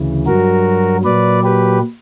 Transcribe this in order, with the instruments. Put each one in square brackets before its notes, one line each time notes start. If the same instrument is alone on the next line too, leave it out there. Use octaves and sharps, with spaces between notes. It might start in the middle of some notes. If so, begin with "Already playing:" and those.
Already playing: [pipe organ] D2 C#3 E3
G2 F#3 F#4 A#4
A#2 F#3 B4 D5
G4 B4